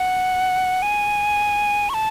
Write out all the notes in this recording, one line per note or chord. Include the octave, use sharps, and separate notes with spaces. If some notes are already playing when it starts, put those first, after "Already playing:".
Already playing: F#5
G#5
C#6
A5